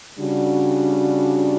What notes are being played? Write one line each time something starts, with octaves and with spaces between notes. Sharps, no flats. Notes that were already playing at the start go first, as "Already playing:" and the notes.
C#3 G3 D4 F#4